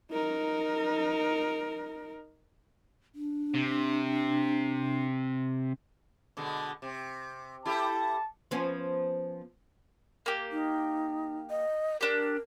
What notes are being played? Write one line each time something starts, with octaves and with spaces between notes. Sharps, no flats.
D#4 A#4
D4
C3
B2 D3 G#3
C3
E4 G4 A4 A5
F3 B3 C#4
A#3 G4
D#4
D#5
D4 G4 A#4